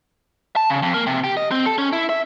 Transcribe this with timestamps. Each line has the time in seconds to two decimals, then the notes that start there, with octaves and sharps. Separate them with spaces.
0.56 A5
0.70 C#3
0.83 F2
0.94 A#3
1.07 C3
1.24 G4
1.37 D#5
1.51 C4
1.66 A4
1.78 C#4
1.93 E4
2.09 E5